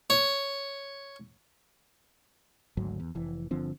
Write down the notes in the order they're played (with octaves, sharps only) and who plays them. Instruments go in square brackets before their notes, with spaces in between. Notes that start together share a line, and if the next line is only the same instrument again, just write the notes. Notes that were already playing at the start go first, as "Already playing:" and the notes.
[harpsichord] C#5
[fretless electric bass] G#1 D2 G#2 F#3
E2
F1 E3
G1 D3 F3 C4